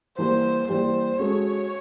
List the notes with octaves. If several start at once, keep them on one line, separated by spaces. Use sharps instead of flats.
E3 G3 A#3 C5
E3 G3 A#3 C5
G#3 C#4 F#4 A4 C#5